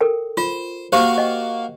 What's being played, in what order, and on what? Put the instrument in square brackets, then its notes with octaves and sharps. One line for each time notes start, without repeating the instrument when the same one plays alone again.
[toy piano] A4 A#4 G5
[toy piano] F4 [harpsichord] C5
[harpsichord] A#3 F#4 F5 [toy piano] G4 C5
[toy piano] D#5 G5